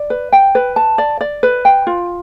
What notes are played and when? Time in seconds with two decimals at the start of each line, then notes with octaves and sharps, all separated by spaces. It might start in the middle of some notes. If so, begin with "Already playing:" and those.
Already playing: D5
0.10 B4
0.32 G5
0.55 B4
0.76 A5
0.98 D5
1.21 D5
1.43 B4
1.65 G5
1.87 F4